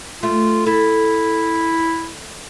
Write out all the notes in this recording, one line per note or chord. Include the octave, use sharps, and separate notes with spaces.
A3 F4
E4 A4